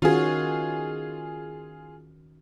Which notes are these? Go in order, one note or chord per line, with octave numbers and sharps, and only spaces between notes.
D#3 C#4 F4 F#4 G#4